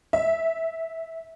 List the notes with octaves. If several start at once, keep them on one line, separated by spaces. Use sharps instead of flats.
E5